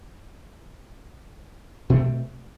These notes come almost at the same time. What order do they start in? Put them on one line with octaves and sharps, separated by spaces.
B2 A3 C4